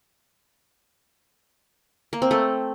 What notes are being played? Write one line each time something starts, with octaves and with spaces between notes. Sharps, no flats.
A#3
C4
A3